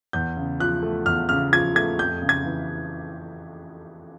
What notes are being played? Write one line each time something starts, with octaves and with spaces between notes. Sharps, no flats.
E2 G6
C#3
F3 F#6
A3
E2 F6
C#3 F6
F3 G#6
A3 G#6
F2 G6
C#3
G#6
E3